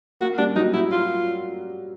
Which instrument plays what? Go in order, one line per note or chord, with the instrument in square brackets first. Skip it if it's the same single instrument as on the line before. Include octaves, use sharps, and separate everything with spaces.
[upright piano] A#3 [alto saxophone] F#4
[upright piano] G3 [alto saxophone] D4
[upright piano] F#3 [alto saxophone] D#4
[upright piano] F#3 [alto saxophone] E4
[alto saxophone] F4